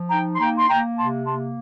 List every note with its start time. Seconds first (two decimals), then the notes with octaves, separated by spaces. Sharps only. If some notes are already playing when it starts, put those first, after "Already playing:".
Already playing: F3
0.11 D#4 G5 A#5
0.35 C6
0.40 A#3 G5 A#5
0.57 C6
0.69 A#3 G5 A#5
0.98 C3 A5 C6
1.26 A#3 A5 C6